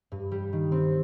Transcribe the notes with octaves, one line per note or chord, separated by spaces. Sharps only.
G2
G3
D#3
C4